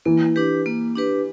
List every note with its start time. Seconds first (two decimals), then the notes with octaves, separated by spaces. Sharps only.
0.05 E3 A#3
0.36 D4 G4 B4
0.66 A#3
0.95 D4 G4 B4